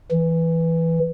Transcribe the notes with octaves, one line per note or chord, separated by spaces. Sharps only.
E3